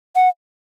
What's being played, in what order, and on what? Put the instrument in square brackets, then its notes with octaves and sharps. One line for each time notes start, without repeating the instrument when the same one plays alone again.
[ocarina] F#5